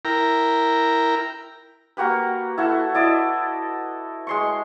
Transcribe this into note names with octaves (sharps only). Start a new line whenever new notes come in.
E4 A#4 G5 A#5
A#3 F#4 G4 B4
E4 F#4 A4
E4 D5 D#5 A5
G#3 C6 C#6